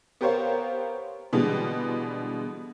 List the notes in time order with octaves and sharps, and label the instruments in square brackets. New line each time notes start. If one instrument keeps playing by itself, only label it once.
[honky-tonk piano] B3 G4 A#4 C5 C#5 F5
B2 D3 E3 G3 G#3